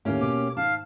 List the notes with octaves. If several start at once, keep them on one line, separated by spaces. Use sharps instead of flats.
D#2 A2 A#3 C#4 G4
B2 D6
G#2 D#3 F5 A5